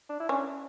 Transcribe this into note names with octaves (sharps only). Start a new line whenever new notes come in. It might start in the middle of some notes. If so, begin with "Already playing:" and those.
D4
E4
C#4 D4